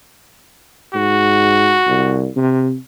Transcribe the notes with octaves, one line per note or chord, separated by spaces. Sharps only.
G#2 F#4
C2
C3